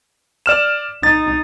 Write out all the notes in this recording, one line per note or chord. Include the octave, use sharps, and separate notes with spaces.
D5 F6 E7
D#4 A6